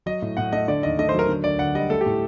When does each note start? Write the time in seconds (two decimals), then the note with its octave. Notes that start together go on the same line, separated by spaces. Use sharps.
0.06 F#3 D#5
0.22 A2
0.37 A2 F#5
0.52 A3 D#5
0.68 D3 D5
0.83 D#2 D#5
0.99 A3 D#5
1.09 C5
1.14 F#3 A#4
1.29 D3
1.44 D2 D5
1.59 D2 F#5
1.75 G3 D#5
1.90 A3 A4
2.01 G4
2.06 A2